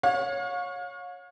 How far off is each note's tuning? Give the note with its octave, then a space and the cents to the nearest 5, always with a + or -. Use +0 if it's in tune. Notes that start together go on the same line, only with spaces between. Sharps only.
C#5 -5 F5 +40